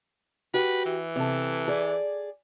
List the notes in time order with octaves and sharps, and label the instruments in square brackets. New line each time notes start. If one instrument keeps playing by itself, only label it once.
[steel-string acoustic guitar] F#4 G4 [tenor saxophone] B4
[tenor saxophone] E3
[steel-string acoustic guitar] C3 A4
G#4 D5